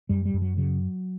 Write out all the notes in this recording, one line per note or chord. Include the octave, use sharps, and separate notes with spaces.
F#2 G3
G3
F#2
F#3
C#3 F#3